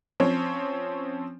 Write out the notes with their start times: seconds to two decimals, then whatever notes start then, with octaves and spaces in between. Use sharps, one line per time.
0.20 F3 C4 C#4 C#5